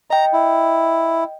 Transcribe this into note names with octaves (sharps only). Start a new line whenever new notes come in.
D#5 G5 A#5
E4